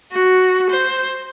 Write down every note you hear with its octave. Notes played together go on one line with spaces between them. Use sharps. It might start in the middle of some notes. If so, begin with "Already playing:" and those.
F#4
C5